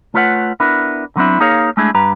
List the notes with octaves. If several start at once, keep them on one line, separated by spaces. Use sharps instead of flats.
A3 F4 B4 C#5 E5 F#5
B3 D4 E4 A#4
D3 F#3 B3 C4 D4 E4
A#3 D#4 G#4 A#4 C#5 F5
G#3 A3 D4 E4 G#4
G2 G4 B4 A#5